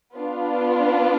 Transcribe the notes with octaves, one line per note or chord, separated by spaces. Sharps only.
B3 D4 F4